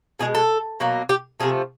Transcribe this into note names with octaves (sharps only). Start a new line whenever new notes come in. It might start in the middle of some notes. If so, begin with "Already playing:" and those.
B2 G#3 G#4
A4
B2 F#3 A#3
G4
C3 F3 A3 G#4